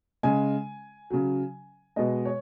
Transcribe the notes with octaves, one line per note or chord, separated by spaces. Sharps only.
C#3 G#3 G#5
C#3 F#3
B2 G#3 D#5
C#5